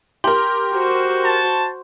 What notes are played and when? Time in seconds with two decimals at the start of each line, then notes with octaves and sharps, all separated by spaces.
0.24 G4 A#4 C6
0.73 F#4 C5
1.25 A5